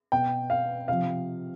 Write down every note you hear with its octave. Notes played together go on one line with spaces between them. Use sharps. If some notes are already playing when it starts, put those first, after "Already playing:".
B2 G5
F5
C3 F3 F5